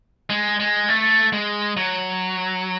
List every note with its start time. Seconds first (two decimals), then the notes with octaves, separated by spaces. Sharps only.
0.30 G#3
0.60 G#3
0.89 A3
1.33 G#3
1.77 F#3